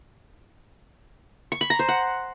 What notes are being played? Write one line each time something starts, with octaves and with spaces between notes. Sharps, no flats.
C#6
B5
A#5
C5
F#5